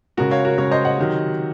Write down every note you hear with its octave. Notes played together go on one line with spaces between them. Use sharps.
C#3 G#3 F#4 A#4
C#5 F5
F#4 A#4
C#3 G#3 A#4 C#5
C5 D#5
D#5 F#5
C3 D#3 F#3